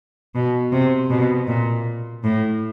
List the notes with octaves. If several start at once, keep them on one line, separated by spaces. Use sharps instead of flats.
B2
C3
B2
A#2
A2